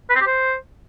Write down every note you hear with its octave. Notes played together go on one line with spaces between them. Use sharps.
B4
C4
G4
C5